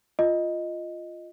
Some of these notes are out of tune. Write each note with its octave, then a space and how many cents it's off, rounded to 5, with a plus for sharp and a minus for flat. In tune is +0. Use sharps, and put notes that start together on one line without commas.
F4 +0 D#5 +0